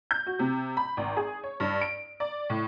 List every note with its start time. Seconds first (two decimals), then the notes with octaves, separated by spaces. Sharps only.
0.11 G6
0.26 F#4
0.39 C3
0.77 B5
0.97 G#1
1.17 G#4
1.44 C#5
1.60 G2
1.81 D7
2.20 D5
2.50 A2